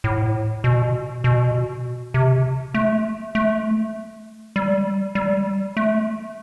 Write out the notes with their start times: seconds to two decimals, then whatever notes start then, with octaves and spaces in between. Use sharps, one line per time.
0.04 A2
0.64 B2
1.24 B2
2.14 C3
2.74 A3
3.35 A3
4.56 G3
5.15 G3
5.77 A3